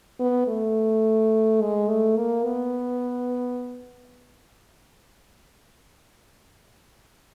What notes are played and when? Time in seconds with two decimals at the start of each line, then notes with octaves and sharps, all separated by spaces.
0.20 B3
0.47 A3
1.61 G#3
1.88 A3
2.17 A#3
2.44 B3